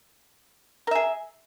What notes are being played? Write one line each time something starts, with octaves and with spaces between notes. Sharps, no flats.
G#4 A#4 E5